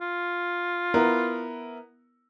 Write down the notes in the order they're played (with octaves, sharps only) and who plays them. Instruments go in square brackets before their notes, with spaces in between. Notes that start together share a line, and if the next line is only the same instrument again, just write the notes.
[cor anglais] F4
[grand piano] B3 E4 A#4